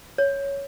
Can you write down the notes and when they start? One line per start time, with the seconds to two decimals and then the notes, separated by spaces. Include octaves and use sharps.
0.18 C#5